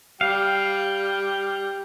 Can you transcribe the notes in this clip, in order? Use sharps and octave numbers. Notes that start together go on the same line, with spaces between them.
G3 F5 G5